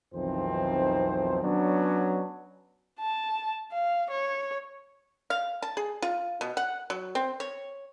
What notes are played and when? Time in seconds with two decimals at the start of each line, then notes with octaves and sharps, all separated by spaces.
0.14 B1 F2 D#3 E3 C4 C5
1.43 F#3 B3 C#4 D4
3.00 A5
3.72 F5
4.11 C#5
5.30 F5
5.62 A5
5.77 G#4
6.02 F4
6.41 B2
6.57 F#5
6.90 F#3
7.15 C4
7.40 C#5